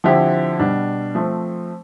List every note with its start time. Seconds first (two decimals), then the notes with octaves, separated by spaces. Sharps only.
0.04 D3 F3 C4 E4 G4
0.59 B2 G3 D4
1.15 F3 A3 C4